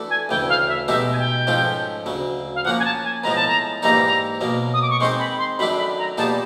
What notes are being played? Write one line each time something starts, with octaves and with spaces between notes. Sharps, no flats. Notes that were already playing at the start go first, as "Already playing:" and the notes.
Already playing: E3 A3 D4 F#4 A4
G#5
D2 C#3 E3 A3 G5
F5
E5
B2 G#3 B3 D#4 G4 E5
G#5
G5
G#2 F3 A3 C#4 F4
D2 C#3 F#3
F5
F3 A#3 C#4 F#5
G#5
A5
G#5
A2 F3 G#3 B3 A#5
A5
A#5
G#2 E3 G3 A#3 D#4 A#5
B2 F#3 A#3
D#6
D6
C#6
D#3 G#3 C4 D#4 G#4 C6
B5
C6
F#2 D#3 F#3 A3 D4 B5
B5
A#5
A#2 G3 B3 D#4 G#4 A5